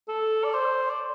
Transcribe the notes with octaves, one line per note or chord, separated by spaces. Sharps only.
A4
D5
C5
D5